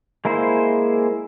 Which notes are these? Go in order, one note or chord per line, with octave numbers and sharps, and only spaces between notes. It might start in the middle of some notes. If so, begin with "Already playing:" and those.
G#3 A#3 E4 C5